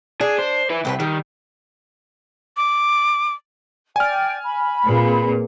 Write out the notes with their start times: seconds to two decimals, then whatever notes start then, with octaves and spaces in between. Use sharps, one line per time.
0.21 D4 G#4
0.39 C5
0.70 E4 B4
0.85 C2 C4 A#4 B4
1.00 D#3 G3
2.57 D6
3.96 D5 G5 G#5 F6
4.45 B5
4.87 A#2 C4 G#4 B4